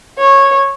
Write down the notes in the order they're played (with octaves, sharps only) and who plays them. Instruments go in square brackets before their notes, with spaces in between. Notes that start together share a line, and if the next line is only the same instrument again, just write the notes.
[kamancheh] C#5